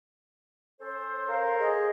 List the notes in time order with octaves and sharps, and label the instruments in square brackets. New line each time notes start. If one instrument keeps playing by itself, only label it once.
[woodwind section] C#4 A4 C5
[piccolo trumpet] A#4 [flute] F5
[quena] G#4 [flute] D#5